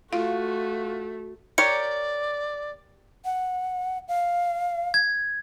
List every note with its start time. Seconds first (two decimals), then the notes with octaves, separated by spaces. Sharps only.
0.13 A3 F4 F#4 F5
1.58 G4 A#4 C#5 D5 C#7
3.25 F#5
4.08 F5
4.94 G#6